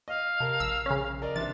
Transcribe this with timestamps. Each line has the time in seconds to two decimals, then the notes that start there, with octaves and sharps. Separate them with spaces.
0.08 D#5 F5
0.40 C3 A#4 A5
0.60 A#1 E6
0.86 C#3 C#4
1.22 A#4 D5 D#5
1.36 C3 E3 D4 E5 A6